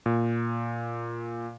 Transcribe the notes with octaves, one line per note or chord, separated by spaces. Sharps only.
A#2